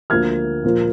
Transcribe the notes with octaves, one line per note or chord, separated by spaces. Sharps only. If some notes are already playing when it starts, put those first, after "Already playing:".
D2 D3 F3 A#3 F6 G#6
A#2 F3 A#3